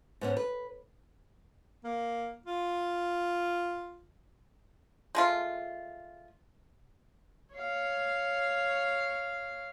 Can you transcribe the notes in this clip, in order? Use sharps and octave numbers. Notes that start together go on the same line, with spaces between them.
G#2 B3 C#4
B4
A#3
F4
G#3 A3 F4
C#5 F5